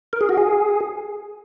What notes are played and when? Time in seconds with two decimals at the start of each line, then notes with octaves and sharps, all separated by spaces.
0.13 A#4
0.21 G#4
0.29 F#4
0.37 G#4